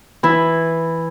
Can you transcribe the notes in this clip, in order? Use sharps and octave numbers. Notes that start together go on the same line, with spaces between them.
E3 E4